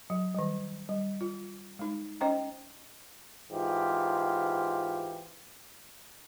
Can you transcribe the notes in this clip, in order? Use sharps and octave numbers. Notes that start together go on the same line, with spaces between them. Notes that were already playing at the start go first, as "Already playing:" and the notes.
F#3
D#3 G3
G3
F4
G#3 D#4
C#4 C5 D#5 G5 A#5
G#2 E3 F4 G4